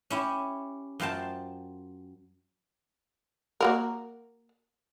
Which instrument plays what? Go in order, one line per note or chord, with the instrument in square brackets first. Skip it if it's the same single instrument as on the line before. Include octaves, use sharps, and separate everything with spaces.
[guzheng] C#4 E4 G4
F#2 F4 C5 G5 A5
[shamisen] A#3 F#4 A#4